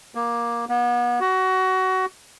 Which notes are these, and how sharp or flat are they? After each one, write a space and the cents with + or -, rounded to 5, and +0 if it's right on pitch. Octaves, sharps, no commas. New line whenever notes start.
A#3 +15
B3 -35
F#4 +20